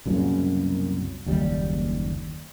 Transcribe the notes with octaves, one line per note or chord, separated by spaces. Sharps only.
C2 F#2 A#2 C#3
F#1 D#2 G3